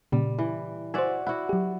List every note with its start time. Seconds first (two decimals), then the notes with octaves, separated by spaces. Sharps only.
0.12 A#2 C#3 G3
0.38 E3
0.94 F#4 C5 D5 E5 G#5
1.27 E4 F#4 F#5
1.49 F#3 G4